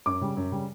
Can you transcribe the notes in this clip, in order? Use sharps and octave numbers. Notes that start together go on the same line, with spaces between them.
F#2 D6
C#3 G3
F#2
C#3 G3